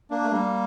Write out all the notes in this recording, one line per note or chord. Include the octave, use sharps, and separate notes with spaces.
A#3 D4
A3
G3 A#3